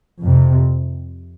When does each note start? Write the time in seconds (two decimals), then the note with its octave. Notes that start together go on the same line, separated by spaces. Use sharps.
0.22 F2 C3